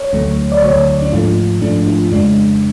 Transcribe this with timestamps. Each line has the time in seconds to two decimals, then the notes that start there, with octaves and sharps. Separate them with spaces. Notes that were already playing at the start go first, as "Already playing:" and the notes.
Already playing: C#5
0.13 D2 D3 F#3 A3
0.52 D5
0.62 D2 D3 F#3 A3 C#5
1.02 D4
1.12 G#2 F3 A3 F4
1.61 G#2 F3 A3 D4
1.87 F4
2.12 F2 C#3 G#3 D4